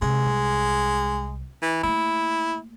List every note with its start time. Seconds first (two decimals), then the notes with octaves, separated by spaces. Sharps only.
0.02 C3 G#3
0.26 C2
1.62 E3
1.83 A3 A#3 E4